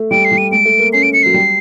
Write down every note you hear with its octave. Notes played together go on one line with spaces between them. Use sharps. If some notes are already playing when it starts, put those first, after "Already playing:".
Already playing: A3
G3 D7
C7
G3
D#7
G#3 D7
A3
A#3
C#4 C7
D7
C#7
F#3 C7
G3